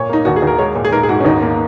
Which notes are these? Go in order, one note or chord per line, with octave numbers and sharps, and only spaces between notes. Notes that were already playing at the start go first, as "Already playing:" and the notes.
Already playing: A#2 C#5
A#3 D#4
D#2 F#4
G#4
D#2 A#4
G#3 C#5
A#2
G#4
G#2 A#4
G#4
G#2 F#4
C#4
D#2 D#4
A#3